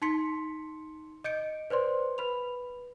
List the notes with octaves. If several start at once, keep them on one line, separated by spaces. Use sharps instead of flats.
D#4 A5 C6 B6 C#7
D#5 G6 C#7 D7
B4 C5 D5 C6
B4 B5 F7